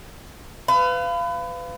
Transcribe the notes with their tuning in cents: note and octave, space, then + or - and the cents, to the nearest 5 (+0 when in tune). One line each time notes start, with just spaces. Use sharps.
B4 +30 F5 -20